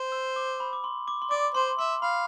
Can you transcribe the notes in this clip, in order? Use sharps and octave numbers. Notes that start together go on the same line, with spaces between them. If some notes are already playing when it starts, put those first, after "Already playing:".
Already playing: C5
E6
D6
B5
D6
C6
D6
C6
D5 D6
C5 C6
E5 C6
F5 B5